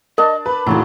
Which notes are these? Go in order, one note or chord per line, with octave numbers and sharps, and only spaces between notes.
D4 A#4 D#5 A5
B4 B5
G#1 D#2 A2 F#3 F4 G#4